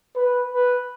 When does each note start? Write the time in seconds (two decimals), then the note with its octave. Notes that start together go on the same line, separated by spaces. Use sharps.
0.16 B4
0.52 B4